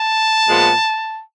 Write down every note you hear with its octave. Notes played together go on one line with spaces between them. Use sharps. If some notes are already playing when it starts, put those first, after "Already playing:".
Already playing: A5
A#2 F3 G#3 B3